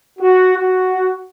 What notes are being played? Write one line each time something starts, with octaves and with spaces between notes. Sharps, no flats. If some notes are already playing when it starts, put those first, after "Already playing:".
F#4
F#4